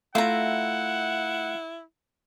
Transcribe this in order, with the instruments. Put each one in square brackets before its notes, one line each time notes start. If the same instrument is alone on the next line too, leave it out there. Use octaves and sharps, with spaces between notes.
[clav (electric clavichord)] A3 [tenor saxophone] E4 [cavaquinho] F4 A#5 [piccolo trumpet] F#5